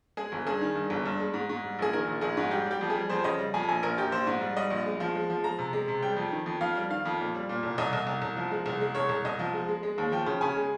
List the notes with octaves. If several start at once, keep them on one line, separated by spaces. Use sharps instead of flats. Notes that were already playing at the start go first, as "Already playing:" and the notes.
G#3 G#4
G1
G2 G#4
D#3
G2
G1
G2
G#3
G#2
G#2
G3
A#1 G#4
D#3 A#4
A#1
A#1 G#4
G#2
G3 G4
G3 G4
F2
G#4
G3
F2 C5
C#3 D#5
G3
F2 G#5
A#1 G#5
A#1 A#4
A#1 G4
A#1 C5
G#2
G3
G3 D#5
A#1
G#3
F3
G#3
F3
G#3 A#5
C3
G#3
C3
G3 G5
F2
D#3
F2
F2 F5
G3
D#3 F5
F2
A#2
G3
A#2
C2
C2 D#5
C2
C2
C2
F3
G#3
C2
G#3
C2 C#5
C2
C2 D#5
F3
G#3
G#3
G#3
D#2
F3 G5
C#3
C#3 G#5
G#3